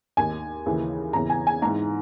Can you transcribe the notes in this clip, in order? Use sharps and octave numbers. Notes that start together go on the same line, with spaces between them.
D#2 D#3 G#5
D#2 C#3 E3
E2 C#3 E3 A#5
G#5
G#5
G#2 E3 A#5